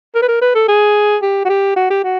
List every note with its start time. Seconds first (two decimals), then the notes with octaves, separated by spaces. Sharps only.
0.15 A#4
0.23 B4
0.28 A#4
0.42 B4
0.55 A4
0.69 G#4
1.22 G4
1.45 F#4
1.49 G4
1.76 F#4
1.90 G4
2.04 F#4